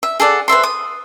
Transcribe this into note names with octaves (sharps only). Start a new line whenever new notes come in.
E5
G#4 A4 D5 F#5
B4 C5 E5 C6
D#6